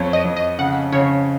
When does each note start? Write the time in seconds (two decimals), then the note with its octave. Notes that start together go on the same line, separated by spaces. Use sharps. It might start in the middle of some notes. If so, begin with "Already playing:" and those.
Already playing: F2 C#5
0.13 D#5
0.25 F2
0.37 D#5
0.58 C#3 F#5
0.92 C#3 C#5